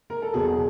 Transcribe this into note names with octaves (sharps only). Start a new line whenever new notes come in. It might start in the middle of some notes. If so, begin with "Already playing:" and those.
A#4
A4
E2 B2 F#3 G#4